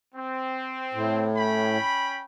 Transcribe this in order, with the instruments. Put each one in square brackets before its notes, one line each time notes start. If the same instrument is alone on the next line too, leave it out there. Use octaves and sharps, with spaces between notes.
[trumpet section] C4
[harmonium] A2
[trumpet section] C#4 G5 B5